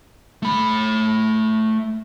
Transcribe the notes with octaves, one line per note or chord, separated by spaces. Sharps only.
A3 B5